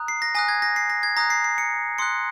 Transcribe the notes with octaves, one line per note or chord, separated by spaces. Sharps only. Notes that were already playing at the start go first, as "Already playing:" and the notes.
Already playing: A#5 D#6 F#6
C7
A#6
G#5 D#6 F#6 A#6
G#6
A#6
C7
A#6
G#6
A#5 D#6 F#6 A#6
C7
C7
C#7
C6 D#6 F#6 C#7